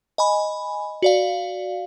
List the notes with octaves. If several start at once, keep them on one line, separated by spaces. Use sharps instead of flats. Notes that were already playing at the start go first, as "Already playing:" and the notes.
D#5 G#5 B5
F#4 D5 F5